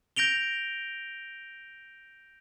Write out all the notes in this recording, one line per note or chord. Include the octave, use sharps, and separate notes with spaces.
G6 A#6 D7 F7 G7